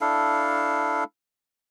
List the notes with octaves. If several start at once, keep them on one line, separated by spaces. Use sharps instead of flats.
D4 E4 A4 F5